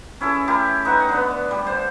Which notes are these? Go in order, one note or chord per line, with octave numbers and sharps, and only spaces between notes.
C#4 E4 G#4 A4
A3 E4 G4 A#4
D#4 B4 E5 F#5
D3 B3
G3
C5